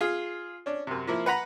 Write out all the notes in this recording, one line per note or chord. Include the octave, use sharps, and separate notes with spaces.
F4 G#4
C#4 D4
F#2 C3
F3 A#3 E4
B4 F#5 A#5 B5